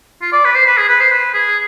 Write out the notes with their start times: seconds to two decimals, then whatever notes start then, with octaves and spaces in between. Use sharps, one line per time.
0.22 F4
0.32 D5
0.45 B4
0.55 C5
0.66 B4
0.77 G#4
0.88 B4
1.00 C5
1.11 B4
1.34 G#4